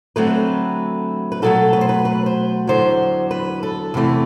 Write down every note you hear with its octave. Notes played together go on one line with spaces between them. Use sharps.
D3 F#3 A3 C4 B4
B4
B2 F#3 A3 A4
B4
C5
B4
B4
C5
E2 D3 F#3 C5
B4
A4
E2 C3 E3 A3